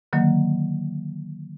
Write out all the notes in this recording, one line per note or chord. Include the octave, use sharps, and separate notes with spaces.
D3 D#3 F#3 A#3